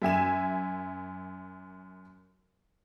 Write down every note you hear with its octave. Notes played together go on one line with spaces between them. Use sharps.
F#2 E5 G#5 E7